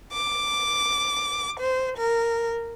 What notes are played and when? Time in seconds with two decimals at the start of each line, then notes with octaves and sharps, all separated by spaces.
0.11 D6
1.58 C5
1.96 A#4